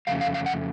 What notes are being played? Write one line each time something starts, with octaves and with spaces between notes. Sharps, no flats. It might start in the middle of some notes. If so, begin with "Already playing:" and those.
F2 C#3 E3 A3 F5
F5
F5
F#5